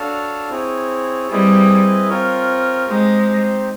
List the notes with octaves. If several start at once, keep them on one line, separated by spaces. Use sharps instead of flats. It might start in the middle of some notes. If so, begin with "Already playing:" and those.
Already playing: D4 F#4 A4 C#5 F5
C4 E4 G#4 C#5
G3 C4 E4 G#4 B4 D#5
C4 F4 A#4 C#5
G#3 C4 D#4 G4 C5